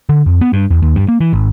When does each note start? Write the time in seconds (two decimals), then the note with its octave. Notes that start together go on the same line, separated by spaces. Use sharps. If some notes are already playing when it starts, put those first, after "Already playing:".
0.09 D3
0.26 F2
0.41 B3
0.53 G2
0.70 E2
0.82 D#2
0.96 G2
1.08 A#3
1.21 E3
1.33 G#1